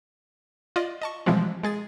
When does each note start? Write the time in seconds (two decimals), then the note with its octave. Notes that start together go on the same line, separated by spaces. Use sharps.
0.76 F4 D5 D#5
1.02 D#5 A5 C#6
1.26 B2 E3 F3 G3 G#3 C4
1.63 G#3 G#4 A6